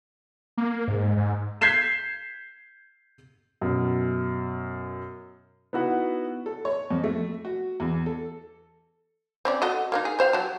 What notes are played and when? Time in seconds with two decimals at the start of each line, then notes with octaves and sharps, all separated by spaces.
0.57 A#3
0.88 G#2
1.17 G#2
1.61 G6 G#6 B6 C7 E7
3.61 F#2 B2
5.73 B3 D#4 E4 F#4
6.46 A4
6.65 C#5
6.91 F2
7.04 A3
7.45 F#4
7.80 E2
8.06 A4
9.45 C4 C#4 D5
9.62 F#4 A4 D#5
9.92 A#3 B3 D#4
10.05 G#4
10.19 G4 C5 F5
10.33 F#3 A5